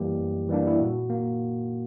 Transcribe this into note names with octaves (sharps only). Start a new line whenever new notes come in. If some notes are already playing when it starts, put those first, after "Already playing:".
Already playing: F#2 E3 G3 A#3 G4
F#2
E3 G3 A#3 D4
E4
A#2 F#4
A#3